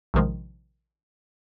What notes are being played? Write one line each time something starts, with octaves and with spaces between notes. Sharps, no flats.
A#1 C3 D#3 F3 G#3